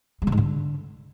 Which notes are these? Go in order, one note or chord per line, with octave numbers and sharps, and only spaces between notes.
G#3
D3
G#2
D3